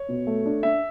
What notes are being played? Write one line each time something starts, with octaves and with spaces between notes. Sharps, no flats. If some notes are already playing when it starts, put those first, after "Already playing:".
Already playing: C#5
B2
A3
D4
D4 E5